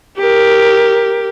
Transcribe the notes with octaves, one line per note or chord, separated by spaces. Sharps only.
G4 A#4